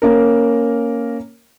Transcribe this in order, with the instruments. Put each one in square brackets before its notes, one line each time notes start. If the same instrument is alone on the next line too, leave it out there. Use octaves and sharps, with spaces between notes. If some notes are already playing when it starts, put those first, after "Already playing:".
[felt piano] A#3 C#4 A#4